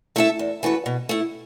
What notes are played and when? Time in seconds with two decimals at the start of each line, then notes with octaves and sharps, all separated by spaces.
0.16 A3 E4 A4 E5
0.39 E2
0.63 E3 A3 F#4 B4
0.86 B2
1.09 A3 E4